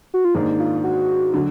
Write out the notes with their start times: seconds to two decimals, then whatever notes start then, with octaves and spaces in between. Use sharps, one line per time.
0.14 F#4
0.25 F4
0.34 G#2 D#3 A#3 D4 D#4
0.60 F4
0.84 F#4
1.34 D3 F#3